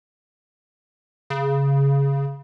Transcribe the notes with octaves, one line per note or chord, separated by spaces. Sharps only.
C#3